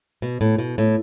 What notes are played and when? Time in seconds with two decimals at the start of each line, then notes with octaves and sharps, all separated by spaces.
0.22 B2
0.41 A2
0.58 B2
0.78 A2